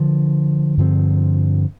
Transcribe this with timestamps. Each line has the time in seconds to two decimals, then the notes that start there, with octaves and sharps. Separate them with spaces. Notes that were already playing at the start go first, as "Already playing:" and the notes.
Already playing: D3 F3 D4
0.77 G2 D3 F3 C4